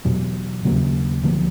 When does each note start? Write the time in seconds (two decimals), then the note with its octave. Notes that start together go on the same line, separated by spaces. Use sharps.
0.05 E2 B2 F#3
0.64 D#2 C#3 F#3 A#3
1.23 D2 D3 F3 A#3